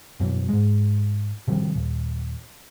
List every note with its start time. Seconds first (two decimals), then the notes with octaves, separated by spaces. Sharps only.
0.20 F#2 B2 E3
0.49 G#2 G#3
1.48 C3 D#3 F3 G3
1.75 D#1